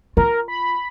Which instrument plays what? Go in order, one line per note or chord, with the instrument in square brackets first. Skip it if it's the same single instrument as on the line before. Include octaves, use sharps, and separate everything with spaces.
[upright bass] F4 [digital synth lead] A#4
[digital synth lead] B5